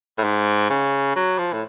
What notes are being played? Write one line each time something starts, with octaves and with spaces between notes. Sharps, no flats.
A2
G#2
C#3
F#3
F3
A2